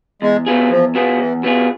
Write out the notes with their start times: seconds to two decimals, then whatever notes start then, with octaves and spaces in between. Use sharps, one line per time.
0.22 E2 G#3
0.46 B2 B3 F4 G#4
0.70 E2 F3
0.95 B2 B3 F4 G#4
1.19 E2 E3
1.43 B2 B3 F4 G#4